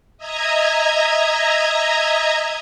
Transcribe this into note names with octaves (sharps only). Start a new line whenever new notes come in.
D#5 E5 A#5 G#6